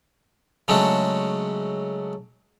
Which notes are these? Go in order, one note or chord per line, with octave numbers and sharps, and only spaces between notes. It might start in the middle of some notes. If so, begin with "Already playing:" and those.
C#3 F#3 G#3 A3 C#4 D4